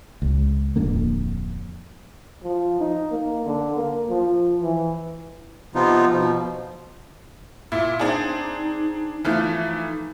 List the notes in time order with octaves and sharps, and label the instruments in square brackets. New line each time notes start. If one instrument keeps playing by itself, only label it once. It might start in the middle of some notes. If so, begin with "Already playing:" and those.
[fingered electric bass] C#2
D1 F2 D3 A#3
[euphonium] F3
D#4
A#3
D3
A#3
F3
E3
[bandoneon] C3 F3 B3 D#4 F4
B2 F3
[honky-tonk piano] A#2 E4
[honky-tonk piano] C4 D4 G#4 [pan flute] D#4
[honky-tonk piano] E3 F3 A3 [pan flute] D#4